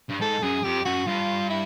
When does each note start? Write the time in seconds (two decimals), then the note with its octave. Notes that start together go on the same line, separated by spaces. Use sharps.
0.10 G2
0.21 G#2 A4
0.42 F#2 G#4
0.64 F2 G4
0.85 F#2 F#4
1.07 G2 F4
1.50 E4